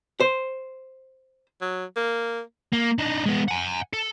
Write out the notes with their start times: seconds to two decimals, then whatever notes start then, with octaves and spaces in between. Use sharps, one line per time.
0.20 C5
1.61 F#3
1.97 A#3
2.73 A#3
2.98 D4 D#4
3.26 G#3 B3
3.48 F#5 G#5
3.93 A4